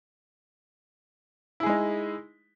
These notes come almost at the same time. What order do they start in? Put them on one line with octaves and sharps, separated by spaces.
E4 G#4 G#3 D#4